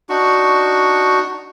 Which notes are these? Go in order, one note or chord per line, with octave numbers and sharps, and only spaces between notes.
D4 D#4 F#4 C#6